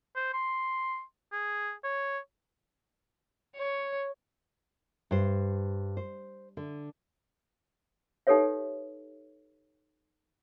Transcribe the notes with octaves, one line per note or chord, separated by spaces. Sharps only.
C5
C6
G#4
C#5
C#5
G2 C5
C5
D3
D#4 G4 A4 B4 C#5 E5